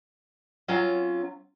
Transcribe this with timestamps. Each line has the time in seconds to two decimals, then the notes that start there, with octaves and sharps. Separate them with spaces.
0.68 F#3 C4 C#4 F4 A#5